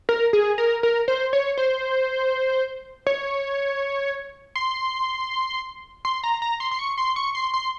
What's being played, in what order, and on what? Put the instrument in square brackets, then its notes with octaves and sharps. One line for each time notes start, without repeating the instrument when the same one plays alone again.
[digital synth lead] A#4
G#4
A#4
A#4
C5
C#5
C5
C#5
C6
C6
A#5
A#5
C6
C6
C#6
C6
C#6
C6
C6